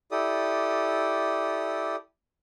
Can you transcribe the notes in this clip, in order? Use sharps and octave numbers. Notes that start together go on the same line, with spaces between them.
E4 G4 A4 D5 D#6